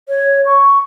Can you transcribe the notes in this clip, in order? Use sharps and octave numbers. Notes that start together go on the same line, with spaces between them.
C#5
C#6